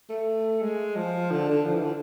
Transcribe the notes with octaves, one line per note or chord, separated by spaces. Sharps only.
A3
G#3
F3
D3
D3
F3
E3
D3